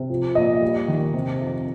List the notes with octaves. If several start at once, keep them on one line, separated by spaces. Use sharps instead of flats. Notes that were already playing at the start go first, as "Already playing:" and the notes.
Already playing: C3
F3
A#2 D#5
G3
D#3
C3
F2